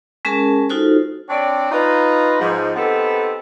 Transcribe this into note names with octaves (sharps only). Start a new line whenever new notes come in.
G#3 C#4 G#4 A#4 A5
D#4 F4 F#4 A4 C5
C4 D4 C#5 D5
D#4 F4 B4
G#2 F3
B3 C4 D#4 G4 A4 B4